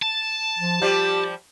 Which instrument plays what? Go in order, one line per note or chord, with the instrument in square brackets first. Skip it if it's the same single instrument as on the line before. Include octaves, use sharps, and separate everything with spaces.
[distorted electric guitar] A5
[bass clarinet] F3
[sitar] F3 G3 [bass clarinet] G4